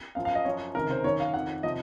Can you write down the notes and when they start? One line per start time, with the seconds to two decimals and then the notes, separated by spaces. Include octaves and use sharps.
0.15 F#2 F3 F5
0.25 F5
0.35 D#5
0.45 F#2 F3 C#5
0.75 C#2 C3 D#3 A#4
0.90 C5
1.04 F#2 D#3 C#5
1.20 F5
1.34 F2 D#3 F#5
1.63 C3 F3 D#5